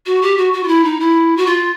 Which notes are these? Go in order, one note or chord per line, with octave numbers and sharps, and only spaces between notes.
F#4
G4
F#4
F#4
F4
E4
D#4
E4
F#4
F4